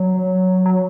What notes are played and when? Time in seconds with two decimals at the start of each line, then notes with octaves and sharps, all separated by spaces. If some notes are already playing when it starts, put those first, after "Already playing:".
Already playing: F#3
0.66 F#3